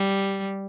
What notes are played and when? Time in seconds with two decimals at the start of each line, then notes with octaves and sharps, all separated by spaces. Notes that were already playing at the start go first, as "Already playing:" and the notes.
Already playing: G3